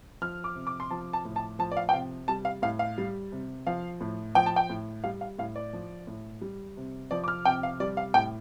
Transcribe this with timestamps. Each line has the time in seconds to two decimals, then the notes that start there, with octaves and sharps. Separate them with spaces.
0.22 F3 F6
0.44 D6
0.55 C3
0.67 D6
0.80 C6
0.91 F3 A5
1.13 A5
1.25 A2
1.36 A5
1.59 F3 A5
1.72 D5
1.77 F5
1.89 G5
1.93 C3 F5
2.28 G3 A5
2.45 F5
2.62 A2 F5
2.79 F5
2.98 G3
3.32 C3
3.67 F3 F5
4.01 A2
4.35 F3 G5
4.46 A5
4.56 G5
4.69 A2
5.04 G3 F5
5.21 F5
5.38 A2 F5
5.56 D5
5.73 F3
6.07 A2
6.41 G3
6.77 C3
7.11 F3 D5
7.24 D6
7.28 F6
7.45 C3 G5
7.63 F5
7.80 G3 D5
7.97 F5
8.14 A2 G5